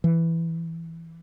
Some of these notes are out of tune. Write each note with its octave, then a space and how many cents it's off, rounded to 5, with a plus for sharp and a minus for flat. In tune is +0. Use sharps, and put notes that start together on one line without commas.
E3 +5